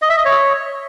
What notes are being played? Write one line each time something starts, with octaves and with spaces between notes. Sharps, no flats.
D#5
E5
D#5
C#5